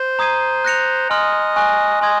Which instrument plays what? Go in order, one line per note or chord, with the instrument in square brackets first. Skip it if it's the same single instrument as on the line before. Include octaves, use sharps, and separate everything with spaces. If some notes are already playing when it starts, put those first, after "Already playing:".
Already playing: [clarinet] C5
[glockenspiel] A#5 D#6 G#6 C7 D#7
F#6 A#6 C#7 F7
[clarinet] D#5 [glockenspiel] G#5 C6 F6
[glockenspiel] G#5 C#6 F#6
[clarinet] D#5 [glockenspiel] G#5 C6 D#6 G#6